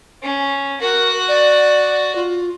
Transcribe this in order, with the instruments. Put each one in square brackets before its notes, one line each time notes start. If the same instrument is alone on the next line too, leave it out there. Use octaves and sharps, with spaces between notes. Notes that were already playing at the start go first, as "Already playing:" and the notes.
[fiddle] C#4
[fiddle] F#4 F#5 [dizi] A#4
[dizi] D5
F4